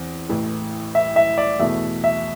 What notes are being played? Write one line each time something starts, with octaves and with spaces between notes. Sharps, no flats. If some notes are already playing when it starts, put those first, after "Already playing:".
Already playing: E2 C4
A1 A2 E3
E5
E5
D5
E2 B2 A3 E5
E5